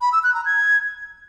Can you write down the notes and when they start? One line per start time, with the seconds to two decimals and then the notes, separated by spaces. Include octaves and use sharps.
0.01 B5
0.12 E6
0.23 F#6
0.34 A#5
0.45 G#6